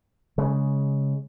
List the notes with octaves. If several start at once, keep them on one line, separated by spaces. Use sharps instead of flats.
C#3 G#3